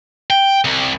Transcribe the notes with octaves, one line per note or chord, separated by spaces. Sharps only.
G5
C2